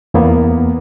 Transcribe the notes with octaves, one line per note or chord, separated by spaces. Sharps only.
E2 E3 A#3 B3